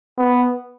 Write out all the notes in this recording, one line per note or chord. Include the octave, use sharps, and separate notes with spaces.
B3